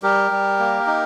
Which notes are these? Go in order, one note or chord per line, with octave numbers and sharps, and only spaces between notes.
G3 G4 A#4
G3
A#3
D#4